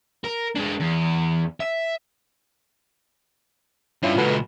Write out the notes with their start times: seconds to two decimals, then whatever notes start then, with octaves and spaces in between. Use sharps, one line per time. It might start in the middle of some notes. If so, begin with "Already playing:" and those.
0.24 A#4
0.55 G#3 D4
0.80 E2
1.60 E5
4.03 G2 C#4 E4 F4
4.17 C#2 A#2 F#4 A4 B4